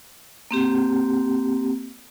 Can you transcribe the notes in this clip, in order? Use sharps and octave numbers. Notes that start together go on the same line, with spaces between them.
A#3 C4 G4